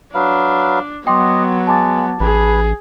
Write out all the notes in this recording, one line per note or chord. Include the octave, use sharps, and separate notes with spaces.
F#3 D4 B4 F5
F#3 B3 D#5 G5 C6 D6
G#3 A5 D6 A6
A1 G#4 B4